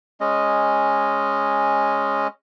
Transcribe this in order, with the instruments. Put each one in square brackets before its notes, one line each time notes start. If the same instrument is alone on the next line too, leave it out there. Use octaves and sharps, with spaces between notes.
[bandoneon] G#3 C#4 D#5